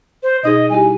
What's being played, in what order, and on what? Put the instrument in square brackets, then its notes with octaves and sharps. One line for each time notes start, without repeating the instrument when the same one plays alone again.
[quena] C5
[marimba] B2 D#4 G#4 [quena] D#5
[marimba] G3 E4 G4 [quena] G#5